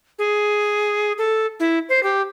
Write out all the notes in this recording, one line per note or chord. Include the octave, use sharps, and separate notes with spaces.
G#4
A4
E4
C5
G4